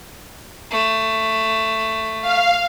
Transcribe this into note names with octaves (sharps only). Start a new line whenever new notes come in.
A3
F5